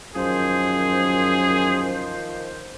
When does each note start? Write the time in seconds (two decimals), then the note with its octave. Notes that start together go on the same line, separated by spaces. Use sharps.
0.16 F#2 D#3 F3 G#4 C5